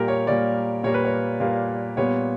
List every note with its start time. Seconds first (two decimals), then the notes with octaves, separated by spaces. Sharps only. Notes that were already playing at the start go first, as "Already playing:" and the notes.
Already playing: A#2 G3 A#3 G4 A#4
0.08 C#5
0.27 A#2 G3 A#3 D5
0.83 A#2 G3 A#3 C#5
0.94 B4
1.05 C#5
1.40 A#2 G3 A#3
1.97 A#2 G3 B3 C#5